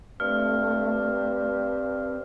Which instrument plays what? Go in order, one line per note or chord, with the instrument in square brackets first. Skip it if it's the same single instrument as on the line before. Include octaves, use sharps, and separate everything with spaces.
[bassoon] G2 [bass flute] A3 [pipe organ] C4 [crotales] F6